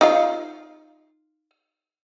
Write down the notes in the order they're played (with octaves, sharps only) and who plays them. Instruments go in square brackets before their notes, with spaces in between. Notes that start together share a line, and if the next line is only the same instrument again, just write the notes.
[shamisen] D#4 F4 F5